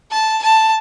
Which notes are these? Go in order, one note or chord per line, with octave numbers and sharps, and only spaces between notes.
A5
A5